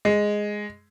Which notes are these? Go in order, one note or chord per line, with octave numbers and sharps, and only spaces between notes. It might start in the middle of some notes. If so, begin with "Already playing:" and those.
G#3